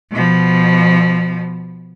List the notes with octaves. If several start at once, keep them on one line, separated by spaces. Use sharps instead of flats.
B2 F3